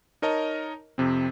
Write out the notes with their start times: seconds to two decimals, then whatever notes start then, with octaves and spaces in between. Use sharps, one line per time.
0.22 D#4 A#4 C#5 D#5 A5 A#5
0.98 F2 C3 C4